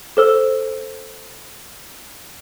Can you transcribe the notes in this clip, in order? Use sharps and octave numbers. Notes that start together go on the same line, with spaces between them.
A4 C5 E6